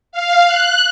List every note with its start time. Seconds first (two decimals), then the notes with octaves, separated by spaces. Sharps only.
0.12 F5
0.46 F#6